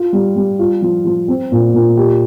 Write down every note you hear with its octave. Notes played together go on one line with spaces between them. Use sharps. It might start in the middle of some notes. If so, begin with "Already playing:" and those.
Already playing: F4
G3
G3
F4
F3
F3
C4
A#2
A#2
G4